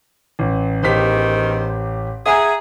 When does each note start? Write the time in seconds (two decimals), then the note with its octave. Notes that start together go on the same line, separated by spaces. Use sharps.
0.39 A1
0.83 A1 E2 D#3 G4 C5 B6
2.26 G#4 E5 F#5 A#5